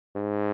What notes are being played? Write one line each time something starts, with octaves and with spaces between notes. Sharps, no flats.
G#2